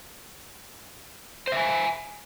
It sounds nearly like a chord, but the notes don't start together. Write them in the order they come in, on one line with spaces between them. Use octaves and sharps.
C5 E5 G#5